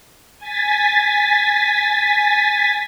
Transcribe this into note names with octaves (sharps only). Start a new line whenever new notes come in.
G#5 A6 B6